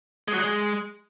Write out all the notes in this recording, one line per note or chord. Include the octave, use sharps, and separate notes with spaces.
G#3
F#3
G#3